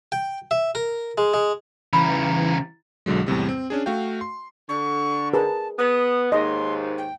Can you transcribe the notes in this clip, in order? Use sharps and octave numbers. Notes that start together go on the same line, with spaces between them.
G5
E5
A#4
G#3
G#3
C#3 E3 G3 A#5 B5
B1 B2 D3 F#3 G#3
E2 A2 C3 G3
C4
C#4 D4 G#4
A3 F#4 F5 G5
C6
D3 C#6
G#4 A#4 B4 A5
B3 D#6
D#2 G#2 D#5 C6
G5